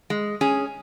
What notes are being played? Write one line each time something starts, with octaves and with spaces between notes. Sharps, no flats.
G#3
C#4 G#4